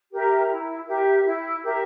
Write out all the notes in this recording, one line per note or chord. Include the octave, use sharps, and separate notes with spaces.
G4 A#4 E5
E4
G4 A#4 E5
E4
G4 A#4 E5